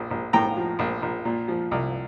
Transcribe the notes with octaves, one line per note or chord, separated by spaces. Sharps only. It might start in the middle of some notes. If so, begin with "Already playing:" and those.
Already playing: A#1
A#1
A2 G5 A#5
F3
A#1
A#1
A#2
F3
C2